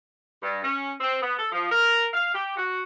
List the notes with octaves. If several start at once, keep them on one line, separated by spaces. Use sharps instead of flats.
G2
C#4
C4
B3
A4
F3
A#4
F5
G4
F#4